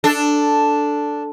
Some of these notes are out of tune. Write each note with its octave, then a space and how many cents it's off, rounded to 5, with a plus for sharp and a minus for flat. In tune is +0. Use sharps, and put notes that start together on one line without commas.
D4 +0 A4 +0